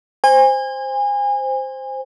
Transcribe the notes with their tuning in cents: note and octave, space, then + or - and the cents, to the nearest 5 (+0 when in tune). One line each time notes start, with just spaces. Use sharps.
C5 +0 G#5 -30